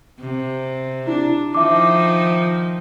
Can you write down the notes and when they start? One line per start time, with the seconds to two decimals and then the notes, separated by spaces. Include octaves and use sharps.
0.20 C3
1.07 D4 E4
1.55 D#3 F3 D#4 E5 D6